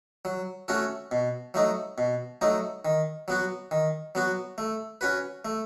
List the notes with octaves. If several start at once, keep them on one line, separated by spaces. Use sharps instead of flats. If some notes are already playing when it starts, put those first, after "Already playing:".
F#3
A3 C#4 F#4 A4
B2
F#3 A3 D#4
B2
F#3 A3 D#4
D#3
F#3 B3 F#4
D#3
F#3 B3 F#4
A3
C#4 F#4 B4
A3